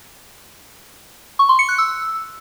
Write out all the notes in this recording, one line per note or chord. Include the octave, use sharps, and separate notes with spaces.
C#6
C6
C#7
F#6
E6